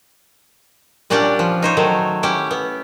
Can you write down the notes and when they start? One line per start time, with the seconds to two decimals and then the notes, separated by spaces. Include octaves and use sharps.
1.10 A#2 G3 C#4 D4 G4 F#5
1.39 F3
1.62 D#4 C5 C#5
1.77 D#3 F#3 A3
2.23 C#4 E4 G4
2.51 B3